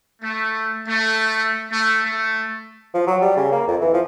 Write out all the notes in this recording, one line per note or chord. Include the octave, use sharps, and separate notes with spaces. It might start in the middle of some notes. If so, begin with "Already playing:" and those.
A3
A3
A3
A3
F3
F#3
G3
C#3
A#3
F2
E3
F3